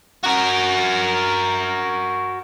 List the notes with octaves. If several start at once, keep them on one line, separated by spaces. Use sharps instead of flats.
F#4 A#4